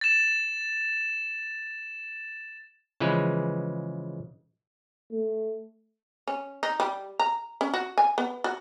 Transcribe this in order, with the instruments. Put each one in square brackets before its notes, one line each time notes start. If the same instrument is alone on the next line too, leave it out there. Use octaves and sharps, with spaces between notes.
[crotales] A6 E7
[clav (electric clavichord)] C#3 E3 F3 G#3 B4
[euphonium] A3
[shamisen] C#4
D#4
G3
A#5
C#4
F#4
G#5
B3
F#4